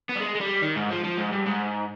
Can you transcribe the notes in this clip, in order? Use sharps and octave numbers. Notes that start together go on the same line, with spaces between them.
B3
G3
G#3
G#3
G3
D#3
G#2
F3
F3
G#2
G2
G#2